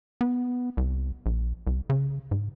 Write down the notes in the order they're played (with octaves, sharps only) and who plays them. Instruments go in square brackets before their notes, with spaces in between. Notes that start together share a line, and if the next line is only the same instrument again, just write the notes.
[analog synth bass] B3
C2
A#1
C2
C#3
G#2